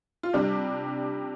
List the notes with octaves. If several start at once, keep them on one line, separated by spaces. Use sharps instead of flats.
F4
C3 G3 D4